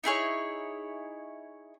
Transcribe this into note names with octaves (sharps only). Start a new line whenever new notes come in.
D#4 E4 G#4 C#5